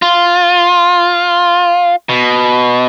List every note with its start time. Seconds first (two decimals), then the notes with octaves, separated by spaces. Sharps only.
0.02 F4
2.09 B2